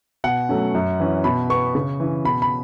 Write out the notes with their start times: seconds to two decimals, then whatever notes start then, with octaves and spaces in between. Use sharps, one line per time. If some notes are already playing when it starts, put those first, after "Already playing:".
0.24 B2 F#5
0.49 F#3 A3 C#4
0.75 F#2
1.00 E3 C#4
1.24 B2 B5
1.50 B3 C#6
1.75 C#3
2.00 E3 C#4
2.25 B2 B5
2.42 B5